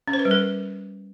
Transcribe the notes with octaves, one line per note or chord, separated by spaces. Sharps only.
C#4
C5
B4
G3
A#4